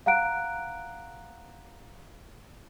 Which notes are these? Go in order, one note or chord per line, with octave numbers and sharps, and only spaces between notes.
F5 F#5 A#5 F#6 D7